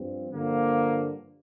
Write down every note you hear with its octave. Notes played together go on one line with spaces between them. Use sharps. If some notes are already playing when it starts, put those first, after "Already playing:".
Already playing: G2 F3 C4
G2 D3 F3 A#3